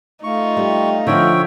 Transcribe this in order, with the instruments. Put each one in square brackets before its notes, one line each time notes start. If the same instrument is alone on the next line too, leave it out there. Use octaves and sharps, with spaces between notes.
[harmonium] A3 F4 [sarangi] D#4 [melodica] C#6
[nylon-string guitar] G3
[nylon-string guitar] D3 F3 [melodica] C#5 E5 G5